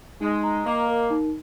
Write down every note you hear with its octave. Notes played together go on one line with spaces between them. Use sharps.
G#3 D#4
A#5
A#3 D#5
A#4
D#4